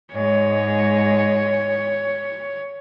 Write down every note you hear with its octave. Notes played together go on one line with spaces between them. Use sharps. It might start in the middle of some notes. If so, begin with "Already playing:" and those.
G#2 G#3 C#5